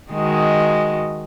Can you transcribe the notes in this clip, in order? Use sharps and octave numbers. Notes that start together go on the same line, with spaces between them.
D#3 G#3 F#4